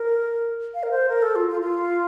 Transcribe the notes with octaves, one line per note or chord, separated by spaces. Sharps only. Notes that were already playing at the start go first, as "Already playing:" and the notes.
Already playing: A#4
F5
A#4
C5
A#4
A4
F4
F4
F4